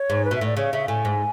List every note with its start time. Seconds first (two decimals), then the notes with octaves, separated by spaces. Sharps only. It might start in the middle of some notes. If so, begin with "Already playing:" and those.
Already playing: C#5
0.10 G#2
0.25 B4
0.31 B2 E5
0.41 A2 D5
0.57 C#3 C#5
0.73 C#3 E5
0.88 A2 G#5
1.05 G#2